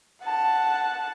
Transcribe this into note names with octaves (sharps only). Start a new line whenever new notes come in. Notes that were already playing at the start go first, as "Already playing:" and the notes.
F#5 A5